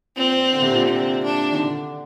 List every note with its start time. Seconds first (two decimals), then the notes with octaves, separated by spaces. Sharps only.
0.16 A#2 C4
0.52 D3
0.62 C3
0.71 A#2
0.80 C3
0.88 C4
1.24 D4
1.52 D#3
1.59 D3